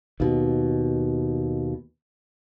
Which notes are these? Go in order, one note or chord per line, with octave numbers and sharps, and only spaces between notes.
D#2 B2